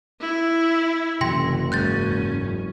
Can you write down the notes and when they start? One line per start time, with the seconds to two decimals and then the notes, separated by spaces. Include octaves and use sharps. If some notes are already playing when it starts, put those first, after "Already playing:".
0.20 E4
1.21 F#1 C3 E3 F#3 G5 C6 A#6
1.72 E2 G#2 G#3 C#4 F#6 G6 A6